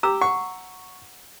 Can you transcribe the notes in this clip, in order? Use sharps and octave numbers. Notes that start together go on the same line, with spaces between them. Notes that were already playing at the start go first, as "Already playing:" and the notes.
G4 A#5 E6
F#5 C#6